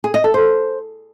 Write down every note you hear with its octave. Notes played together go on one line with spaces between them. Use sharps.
G#4
D#5
A4
C5